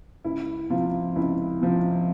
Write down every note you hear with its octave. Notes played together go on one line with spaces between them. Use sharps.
C#2 E4
C3 F3 F4
C#2 E4
C3 F3